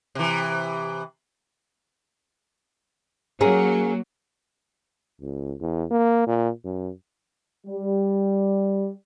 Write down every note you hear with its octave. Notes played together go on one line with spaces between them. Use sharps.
C3 E3
F#3 A#3 C#4 G#4 A#4
C#2
E2
A#3
A#2
F#2
G3